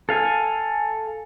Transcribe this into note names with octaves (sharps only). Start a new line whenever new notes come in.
A4 F5 G#5